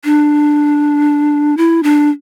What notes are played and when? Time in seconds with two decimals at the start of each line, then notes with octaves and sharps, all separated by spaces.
0.05 D4
1.57 E4
1.83 D4